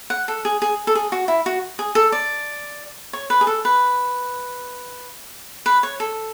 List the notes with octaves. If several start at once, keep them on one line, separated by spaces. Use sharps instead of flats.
F#5
A4
G#4
G#4
A4
G#4
F#4
E4
F#4
G#4
A4
D5
C#5
B4
G#4
A4
B4
B4
C#5
A4